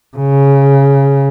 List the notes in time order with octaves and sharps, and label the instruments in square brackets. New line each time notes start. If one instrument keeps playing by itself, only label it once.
[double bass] C#3